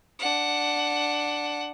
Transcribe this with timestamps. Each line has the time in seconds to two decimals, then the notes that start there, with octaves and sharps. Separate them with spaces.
0.20 D4 F#5